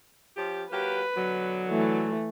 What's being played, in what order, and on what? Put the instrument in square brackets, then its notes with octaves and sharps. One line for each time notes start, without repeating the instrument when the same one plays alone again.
[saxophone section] F3 C#4 G4
[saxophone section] F#3 A#3 G4 [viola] B4
[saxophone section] B2 D3 F#3
[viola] E3 A3